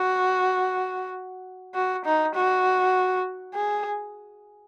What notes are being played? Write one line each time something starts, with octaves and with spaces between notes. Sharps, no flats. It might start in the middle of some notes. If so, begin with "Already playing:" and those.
Already playing: F#4
F#4
D#4
F#4
G#4